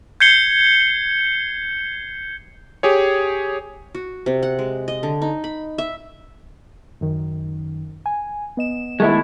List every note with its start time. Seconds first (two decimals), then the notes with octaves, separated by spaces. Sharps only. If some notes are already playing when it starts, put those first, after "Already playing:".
0.20 G6 G#6 C7 C#7 G7
2.83 G4 G#4 C#5
3.95 F#4
4.26 C3
4.43 F#5
4.59 G#3
4.88 D#5
5.03 D3
5.22 D#4
5.44 B5
5.78 E5
7.01 F#2 D#3
8.06 G#5
8.57 B3 D#5 E7
9.00 D#3 G#3 A3 B3 E4 C#6